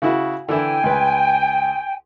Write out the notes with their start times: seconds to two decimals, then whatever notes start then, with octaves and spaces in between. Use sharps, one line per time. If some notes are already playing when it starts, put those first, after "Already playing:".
0.02 C#3 E4 F#4
0.49 D3 E3 E4 G5 G#5
0.84 C#2 B4